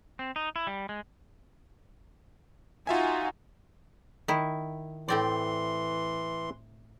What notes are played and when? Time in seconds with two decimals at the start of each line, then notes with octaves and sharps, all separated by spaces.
0.19 C4
0.36 D#4
0.56 E4
0.67 G3
0.89 G#3
2.87 D#4 F4 F#4 E5 G#5
4.28 D#3 E4
5.08 A2 E3 C4 D5 C6